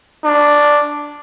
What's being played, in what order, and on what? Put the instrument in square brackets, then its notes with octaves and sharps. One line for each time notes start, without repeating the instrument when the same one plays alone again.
[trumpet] D4